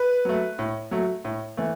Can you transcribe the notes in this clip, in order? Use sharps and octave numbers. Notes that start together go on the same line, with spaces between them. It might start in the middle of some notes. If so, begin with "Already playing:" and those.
Already playing: B4
F#3 A3
A2
F#3 A3
A2
E3 A3